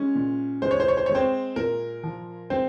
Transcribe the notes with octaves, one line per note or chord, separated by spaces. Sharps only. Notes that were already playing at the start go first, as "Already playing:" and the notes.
Already playing: G#3 C#4
A#2
G#3 C5
C#5
C5
C#5
C5
G#3 C#5
C4 C5
A#2 A#4
F3
G#3 C4 C5